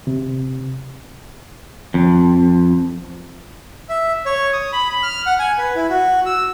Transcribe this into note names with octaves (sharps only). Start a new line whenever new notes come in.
C3
F2
E5
C#5
D#6
B5
B5
F6
F#5
G#5
B4
E4
F#4
E6